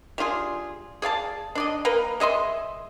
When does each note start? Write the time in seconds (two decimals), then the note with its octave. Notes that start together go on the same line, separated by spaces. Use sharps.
0.18 G3 D4 F4 G#4
1.02 G#4 D5 F5 A5
1.55 D4 D5 D#5
1.85 A#3 A#4 B4
2.20 G#3 D#5 E5 C6